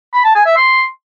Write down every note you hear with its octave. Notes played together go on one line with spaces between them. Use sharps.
B5
A5
G#5
E5
C6